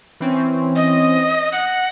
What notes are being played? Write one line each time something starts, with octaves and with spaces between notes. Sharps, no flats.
E3 C4 C#4
D#5
F#5 A#6 C#7